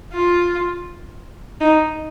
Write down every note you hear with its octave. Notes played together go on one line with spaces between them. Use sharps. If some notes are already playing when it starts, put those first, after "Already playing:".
F4
D#4